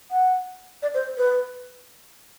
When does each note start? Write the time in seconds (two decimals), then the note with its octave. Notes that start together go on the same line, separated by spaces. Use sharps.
0.11 F#5
0.82 D5
0.94 C5
1.18 B4